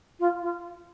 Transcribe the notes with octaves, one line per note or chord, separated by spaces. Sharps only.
F4
F4